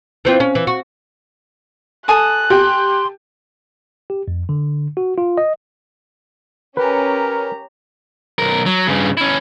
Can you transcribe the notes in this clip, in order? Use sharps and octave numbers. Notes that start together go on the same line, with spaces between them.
E3 C4 F4
C#4
E3
F#4
A4 G#5 D#6 F#6
G4 C6
G4
F2
D3
F#4
F4
D#5
C#4 G4 A#4 B4 A#5
B1 A#4
F#3
G2 C#3
C#4 E4